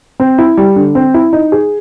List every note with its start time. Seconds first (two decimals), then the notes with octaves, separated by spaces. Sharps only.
0.20 C4
0.38 E4
0.57 G3
0.76 D3
0.95 C4
1.14 E4
1.33 D#4
1.52 G#4